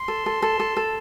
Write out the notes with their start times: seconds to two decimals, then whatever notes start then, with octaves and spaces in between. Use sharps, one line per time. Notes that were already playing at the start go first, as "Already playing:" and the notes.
Already playing: C6
0.08 A4
0.26 A4
0.42 A4
0.60 A4
0.77 A4